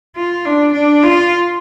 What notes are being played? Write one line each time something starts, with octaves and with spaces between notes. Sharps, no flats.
F4
D4
D4
F4